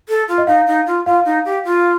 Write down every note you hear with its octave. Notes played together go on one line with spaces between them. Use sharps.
A4
F4
D#5
D#4 F5
D#4
F4
F4 F5
D#4
G4
F4